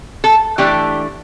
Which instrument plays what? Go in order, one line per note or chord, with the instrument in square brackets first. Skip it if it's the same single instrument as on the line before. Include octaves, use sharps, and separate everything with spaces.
[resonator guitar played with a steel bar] A4
E3 A3 D4 G4